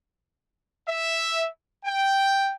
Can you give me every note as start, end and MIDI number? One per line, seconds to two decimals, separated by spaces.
0.88 1.47 76
1.85 2.53 79